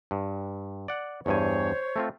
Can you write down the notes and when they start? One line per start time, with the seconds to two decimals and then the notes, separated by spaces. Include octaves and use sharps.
0.11 G2
0.88 D5 F#5
1.26 E2 G2 C5 C#5 G#5
1.96 A3 C4 F4